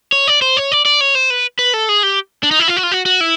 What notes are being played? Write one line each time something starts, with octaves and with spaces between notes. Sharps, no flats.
C#5
D5
C5
C#5
D5
D5
C#5
C5
B4
B4
A4
G#4
G4
D4
D#4
E4
F4
F#4
F4
F#4
F#4
E4